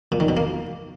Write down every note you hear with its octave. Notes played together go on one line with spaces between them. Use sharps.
A#2
D#3
B2
A#3